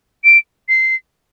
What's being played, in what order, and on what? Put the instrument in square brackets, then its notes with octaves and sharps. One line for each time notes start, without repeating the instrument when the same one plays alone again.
[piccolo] D7
C7